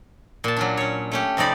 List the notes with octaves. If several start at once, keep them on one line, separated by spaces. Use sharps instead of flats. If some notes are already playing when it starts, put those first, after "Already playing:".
A#2 A5
F#3 C#4 D4
C#4 C#5
A3 C#4 G4
F2 C3 D#4 D5 B5